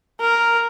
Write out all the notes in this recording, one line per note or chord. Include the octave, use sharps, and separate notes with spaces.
A#4